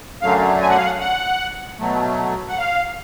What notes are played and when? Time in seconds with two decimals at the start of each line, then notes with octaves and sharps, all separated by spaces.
0.22 F#2 D3 F#3 A3 F5
0.61 G#5
0.69 F#5
0.77 F5
0.85 F#5
1.00 F#5
1.79 B2 F#3 A3
2.49 F#5
2.58 F5